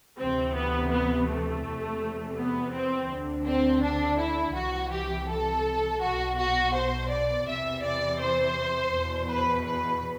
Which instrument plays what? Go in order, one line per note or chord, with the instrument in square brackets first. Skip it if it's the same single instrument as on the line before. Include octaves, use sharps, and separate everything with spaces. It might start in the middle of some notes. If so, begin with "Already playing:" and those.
[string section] D2 C3 E3 C4
B3
B3
A3
E2 C3 E3
B3
C4
D2 D3
C4
D4
E4
C2 C3 E3 F#4
G4
A4
B1 B2 F#4
F#4
C5
D5
E2 C3 E3 E5
D5
C5
E2 B2
B4
B4